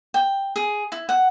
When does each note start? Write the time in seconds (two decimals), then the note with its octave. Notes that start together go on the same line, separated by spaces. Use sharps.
0.14 G5
0.56 G#4
0.92 E4
1.09 F#5